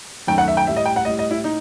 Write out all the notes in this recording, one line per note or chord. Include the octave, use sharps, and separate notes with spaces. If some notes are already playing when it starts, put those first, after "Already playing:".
F#2 D#3 A3 G5
F#5
E5
G5
A2 G3 E5
D#5
G5
F#5
A2 G3 D#5
D#5
E4
A2 D#4